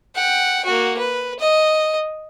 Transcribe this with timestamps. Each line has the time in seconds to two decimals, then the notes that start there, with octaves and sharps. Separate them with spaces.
0.15 F#5 G5
0.65 A#3 F#4
0.99 B4
1.39 D#5